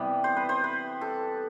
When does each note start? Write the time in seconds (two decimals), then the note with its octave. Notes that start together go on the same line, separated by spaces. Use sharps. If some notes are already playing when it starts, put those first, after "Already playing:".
Already playing: C3 E3 G3 B3
0.24 C5
0.36 B4
0.49 C5
0.64 B4
1.01 A4